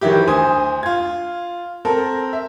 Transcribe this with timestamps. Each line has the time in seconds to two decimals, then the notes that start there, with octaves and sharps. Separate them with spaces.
0.01 D#3 E3 F#3 E4 G4
0.27 D2 C5 G#5 D#6
0.83 F4 G#6
1.85 C4 A4 A#4
2.33 E5